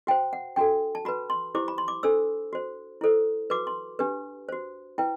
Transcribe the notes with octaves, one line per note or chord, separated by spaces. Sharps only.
F#4 C5 G5
F#5
D4 F#4 A4 G5
A5
F#4 B4 B5
C6
E4 G4 C5 D6
B5
C6
D6
D4 A4 C5 E6
F#4 C5
E4 A4 C5
F#4 B4 D6
C6
D4 G4 B4
F#4 C5
E4 B4 G5